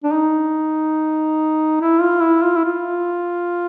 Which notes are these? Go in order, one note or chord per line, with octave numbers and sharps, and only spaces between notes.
D4
D#4
E4
F4
E4
F4
E4
F4